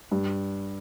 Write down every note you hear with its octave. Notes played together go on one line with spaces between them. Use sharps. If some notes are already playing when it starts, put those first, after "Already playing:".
G2